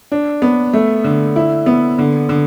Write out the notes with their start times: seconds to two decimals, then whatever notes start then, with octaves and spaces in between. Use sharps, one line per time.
0.12 D4
0.42 B3
0.73 A3
1.04 D3
1.36 E4
1.66 B3
1.99 D3
2.29 D3